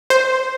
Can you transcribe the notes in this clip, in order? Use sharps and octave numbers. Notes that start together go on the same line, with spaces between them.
C5